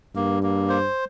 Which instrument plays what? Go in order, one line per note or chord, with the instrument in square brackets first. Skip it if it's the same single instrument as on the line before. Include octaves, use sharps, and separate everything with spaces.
[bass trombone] G2 [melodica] A#3
[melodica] A#3
C5